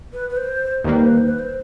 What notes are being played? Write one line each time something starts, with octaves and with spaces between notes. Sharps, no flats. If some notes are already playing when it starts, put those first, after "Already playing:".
B4
B4
C5
D#2 D#3 G3 A#3 B4
C5
B4
C5
B4
C5